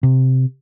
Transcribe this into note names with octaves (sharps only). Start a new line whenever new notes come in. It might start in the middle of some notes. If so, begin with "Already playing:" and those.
C3